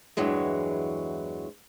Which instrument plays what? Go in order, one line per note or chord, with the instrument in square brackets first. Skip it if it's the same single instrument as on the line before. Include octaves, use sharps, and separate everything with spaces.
[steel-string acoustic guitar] E2 G2 E3 F#3 G#3